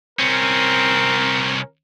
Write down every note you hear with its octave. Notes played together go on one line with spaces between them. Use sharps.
C2 C4 C#4 A#4